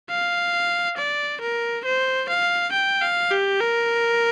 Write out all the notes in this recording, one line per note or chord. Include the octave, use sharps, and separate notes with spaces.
F5
D5
A#4
C5
F5
G5
F5
G4
A#4